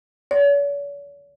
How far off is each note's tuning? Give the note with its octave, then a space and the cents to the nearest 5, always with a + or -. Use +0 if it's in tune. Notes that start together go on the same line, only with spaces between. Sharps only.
C#5 +45